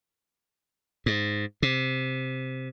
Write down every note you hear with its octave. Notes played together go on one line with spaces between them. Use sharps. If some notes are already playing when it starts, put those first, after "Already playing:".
G#2
C3